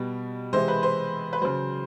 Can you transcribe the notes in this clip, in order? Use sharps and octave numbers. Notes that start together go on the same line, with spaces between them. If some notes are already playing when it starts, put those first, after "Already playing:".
Already playing: B2 G3
C3 E3 G#3 C5
B4
C5
B4
C#3 F#3 C5